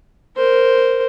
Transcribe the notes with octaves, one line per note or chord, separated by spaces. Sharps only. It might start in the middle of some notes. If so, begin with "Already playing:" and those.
A#4 C5